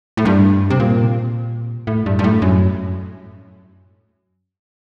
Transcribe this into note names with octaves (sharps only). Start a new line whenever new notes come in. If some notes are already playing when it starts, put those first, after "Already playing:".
A2
G2
C3
A#2
A2
G2
G2
A2
F#2